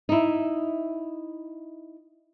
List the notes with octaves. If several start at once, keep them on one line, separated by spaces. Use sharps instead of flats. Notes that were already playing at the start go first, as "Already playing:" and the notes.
D#4 E4